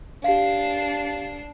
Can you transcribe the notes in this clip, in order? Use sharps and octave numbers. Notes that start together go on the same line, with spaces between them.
D4 G4 F5 C7